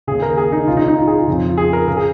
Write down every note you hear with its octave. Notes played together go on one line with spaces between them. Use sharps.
D#2 C#3 G#4
A#4
G#4
D#4
C#2 C#3 F4
D#4
D#4
F4
G#4
F4
F2 C#3
F4
G#4
A#4
C#3 A#4
G#4